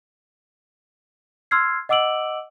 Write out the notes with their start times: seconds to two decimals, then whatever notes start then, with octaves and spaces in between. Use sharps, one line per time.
1.51 C6 E6 F6 G#6 C7
1.89 D#5 F#5 D6 E6 D7 F#7